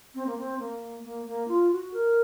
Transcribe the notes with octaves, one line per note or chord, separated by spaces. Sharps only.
C4
A#3
C4
A#3
A#3
A#3
F4
F#4
A#4